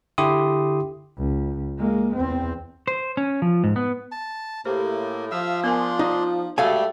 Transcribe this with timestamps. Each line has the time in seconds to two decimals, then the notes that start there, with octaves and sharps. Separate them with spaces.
0.18 D3 E4 G4 C6 D#6
1.18 C#2
1.79 G#3 A#3
2.16 E2 C4
2.88 C5
3.17 C#4
3.42 F3
3.64 G#2
3.76 B3
4.12 A5
4.65 A2 A#3 G4 C5
5.31 F3 E5 F5 E6
5.64 B3 D4 A#4 G#5 C6
5.99 D#4 D5
6.58 G#2 G3 A3 F#4 A4 F5 G#5